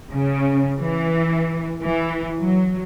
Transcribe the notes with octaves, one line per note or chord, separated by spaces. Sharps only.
C#3
E3
E3
F#3